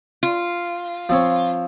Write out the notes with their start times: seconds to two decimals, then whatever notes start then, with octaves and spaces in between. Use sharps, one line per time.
0.23 F4
1.09 F3 C4 C#5